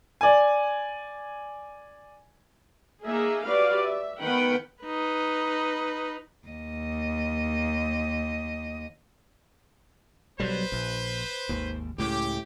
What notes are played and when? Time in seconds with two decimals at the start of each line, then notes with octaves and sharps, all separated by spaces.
0.21 D5 G#5
3.04 A#3 D#4 G#4 E5
3.45 F#4 G4 B4 D5 F5
3.83 E5
4.21 D#3 B3 B4 F#5 G5 B5
4.84 D#4 B4
6.47 D#2 D#5
10.40 B1 F#3 G3 B4 C5
10.72 A#1
11.49 G#1 D#2
11.98 C#2 A2 G4